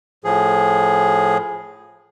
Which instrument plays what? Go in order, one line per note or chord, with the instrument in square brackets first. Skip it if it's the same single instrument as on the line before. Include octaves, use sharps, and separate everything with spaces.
[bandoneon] A2 F3 G#4